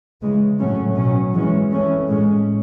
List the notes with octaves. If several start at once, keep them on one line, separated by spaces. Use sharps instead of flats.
C#3 E3 G#3
A2 F#3 A3 C#4
B2 F#3 C#4
E3 G#3 C#4
E3 A3 C#4
A2 G#3 C#4